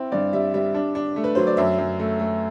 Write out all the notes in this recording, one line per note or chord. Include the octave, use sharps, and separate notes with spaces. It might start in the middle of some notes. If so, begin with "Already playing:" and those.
Already playing: C4 E4
G2 D5
G3 E5
G3 E5
D4
D4
A3
B4
F#3 C5
D5
F#2 E5
F#2
A3
A3